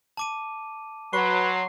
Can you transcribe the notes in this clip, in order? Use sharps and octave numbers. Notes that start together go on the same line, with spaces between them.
A5 D6 D#7
F#3 B4 C6 C#6